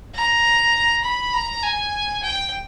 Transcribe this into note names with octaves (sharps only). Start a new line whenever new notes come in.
A#5
B5
A#5
G#5
G5